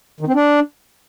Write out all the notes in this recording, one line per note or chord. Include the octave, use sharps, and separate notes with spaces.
D#3
C4
D4